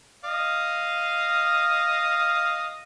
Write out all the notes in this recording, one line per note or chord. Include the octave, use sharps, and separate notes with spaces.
D#5 F5